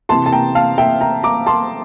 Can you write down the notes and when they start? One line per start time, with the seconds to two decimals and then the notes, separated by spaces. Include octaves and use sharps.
0.09 C3 E3 A5 C6
0.26 A5
0.33 G5 A#5
0.55 F5 A5
0.78 E5 G5
1.01 G5 A#5
1.23 A#5 D6
1.46 A5 C6